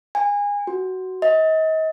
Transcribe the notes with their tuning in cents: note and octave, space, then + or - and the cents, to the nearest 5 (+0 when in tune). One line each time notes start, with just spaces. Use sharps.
G#5 -25
F#4 +15
D#5 +35